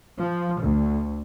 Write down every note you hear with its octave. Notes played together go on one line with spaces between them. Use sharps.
F3
D2